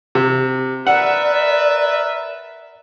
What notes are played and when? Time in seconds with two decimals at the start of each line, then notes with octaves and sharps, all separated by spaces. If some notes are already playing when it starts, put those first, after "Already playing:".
0.15 C3
0.87 A#4 B4 D5 E5 F#5